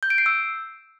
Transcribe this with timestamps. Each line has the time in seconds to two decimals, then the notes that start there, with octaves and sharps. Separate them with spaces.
0.03 G6
0.10 D7
0.18 C7
0.26 E6